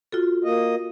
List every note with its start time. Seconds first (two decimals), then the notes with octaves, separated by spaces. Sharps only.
0.12 F4 F#4 A4
0.44 A#3 D#5